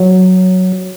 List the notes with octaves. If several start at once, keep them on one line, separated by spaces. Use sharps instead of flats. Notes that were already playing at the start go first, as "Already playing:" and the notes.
Already playing: F#3